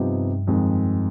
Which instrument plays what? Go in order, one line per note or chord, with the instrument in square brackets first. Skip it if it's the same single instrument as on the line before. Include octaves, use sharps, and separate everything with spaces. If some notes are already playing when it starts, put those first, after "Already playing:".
Already playing: [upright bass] G2 [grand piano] C3 F3 B3 D#4 G4
[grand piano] F2 D#3 G#3